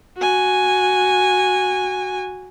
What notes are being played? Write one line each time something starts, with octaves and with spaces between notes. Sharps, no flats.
F#4 G#5